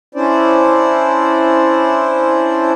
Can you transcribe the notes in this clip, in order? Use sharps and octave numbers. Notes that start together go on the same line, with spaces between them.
C#4 D4 E4 C5 D5